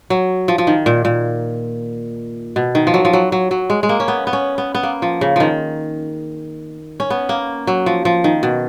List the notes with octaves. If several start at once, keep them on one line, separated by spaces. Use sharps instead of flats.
F#3
F3
F3
D#3
A#2
A#2
B2
D#3
F3
F#3
F3
F#3
F#3
F#3
G#3
G#3
A#3
C#4
B3
B3
C#4
B3
B3
A#3
F3
C#3
D#3 F3
C#4
B3
A#3
F#3
F3
F3
D#3
B2